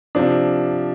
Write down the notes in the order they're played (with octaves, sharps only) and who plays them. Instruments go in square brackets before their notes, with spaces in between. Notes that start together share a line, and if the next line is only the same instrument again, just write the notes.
[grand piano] C3 F3 D4